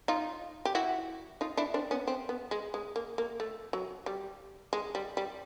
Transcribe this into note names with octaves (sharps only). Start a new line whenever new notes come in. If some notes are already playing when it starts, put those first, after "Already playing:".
D#4 F4
G4
E4 F#4
D#4 F4
D4 E4
C4 D4
B3 C#4
C4
B3
G#3
G#3
A#3
A#3
A3
F#3
G3
G#3
G3
G3